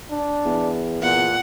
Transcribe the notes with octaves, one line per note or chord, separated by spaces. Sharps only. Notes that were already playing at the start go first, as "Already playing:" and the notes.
D4
E2
E2 A#2 F#5